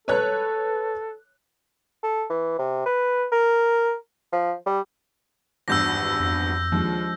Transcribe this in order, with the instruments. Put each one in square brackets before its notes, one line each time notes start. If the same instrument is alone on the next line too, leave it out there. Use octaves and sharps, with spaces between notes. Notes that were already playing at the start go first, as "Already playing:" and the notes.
[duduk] A4 [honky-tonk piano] B4 C#5 F#6
[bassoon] A4
E3
C3
B4
A#4
F3
G3
[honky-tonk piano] G#1 E2 G2 [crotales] E6 G6 A#6
[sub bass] F2
[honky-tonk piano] D#2 [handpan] F3 G#3 D4